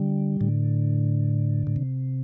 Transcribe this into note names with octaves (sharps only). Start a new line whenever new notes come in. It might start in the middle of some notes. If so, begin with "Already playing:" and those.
Already playing: D3 G3
A2 D3
A2
C3